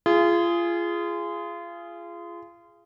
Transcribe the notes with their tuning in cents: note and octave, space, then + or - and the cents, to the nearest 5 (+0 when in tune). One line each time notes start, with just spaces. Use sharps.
F4 -30 G#4 +0